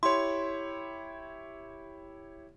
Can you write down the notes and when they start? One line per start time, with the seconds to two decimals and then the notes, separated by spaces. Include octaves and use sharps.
0.03 E4 G4 C#5 C6